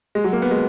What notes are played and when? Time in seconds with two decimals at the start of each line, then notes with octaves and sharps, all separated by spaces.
0.15 G#3
0.24 F#3
0.33 A#3
0.42 B3
0.51 G#3